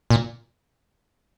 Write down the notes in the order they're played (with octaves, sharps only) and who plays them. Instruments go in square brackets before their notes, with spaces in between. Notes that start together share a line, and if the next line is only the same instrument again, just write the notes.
[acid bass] A#2